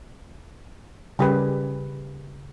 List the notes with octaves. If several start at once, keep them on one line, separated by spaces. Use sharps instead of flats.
C#3 G3 G4 G#4 A#4 B4